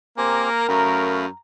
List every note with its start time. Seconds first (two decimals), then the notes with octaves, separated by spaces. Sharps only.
0.18 A#3 C4 G4 A#4 G#5
0.69 F#2 A3 F5 A#5 B5